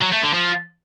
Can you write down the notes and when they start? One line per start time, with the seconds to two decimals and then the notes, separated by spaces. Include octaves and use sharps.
0.02 F#3
0.12 A3
0.23 D3
0.34 F3